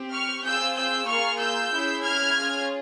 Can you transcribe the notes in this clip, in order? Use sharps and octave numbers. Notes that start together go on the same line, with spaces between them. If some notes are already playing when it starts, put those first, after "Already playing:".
Already playing: C4 G4
C#6 F6
C4 F4 G#4 E6 G6
E6 G6
A#3 F4 G#4 C#6 F6
E6 G6
C#4 E4 G#4
F6 G#6
C#4 F4 G#4